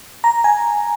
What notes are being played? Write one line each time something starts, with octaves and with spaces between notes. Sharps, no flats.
A#5
G#5